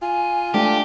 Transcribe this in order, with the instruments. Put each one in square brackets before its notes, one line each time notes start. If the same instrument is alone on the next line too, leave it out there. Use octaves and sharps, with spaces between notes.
[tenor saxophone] F4 [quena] G#5
[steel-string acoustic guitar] A3 D4 [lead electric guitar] G4